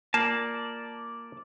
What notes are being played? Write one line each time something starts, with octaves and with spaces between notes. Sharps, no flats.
A#3 F4 D5 A5